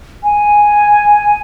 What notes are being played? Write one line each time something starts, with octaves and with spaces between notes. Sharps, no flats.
G#5